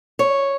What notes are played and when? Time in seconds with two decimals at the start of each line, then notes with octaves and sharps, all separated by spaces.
0.19 C#5